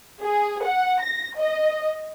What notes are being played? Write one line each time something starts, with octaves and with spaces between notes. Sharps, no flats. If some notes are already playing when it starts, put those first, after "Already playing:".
G#4
F#5
A#6
D#5